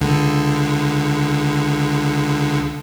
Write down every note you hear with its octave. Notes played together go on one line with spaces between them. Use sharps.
C#2 D3